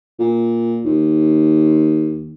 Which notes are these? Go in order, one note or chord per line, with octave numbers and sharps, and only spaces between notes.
A#2
D#2